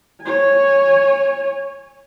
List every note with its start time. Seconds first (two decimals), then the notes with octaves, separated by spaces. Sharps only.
0.22 C#5 G#5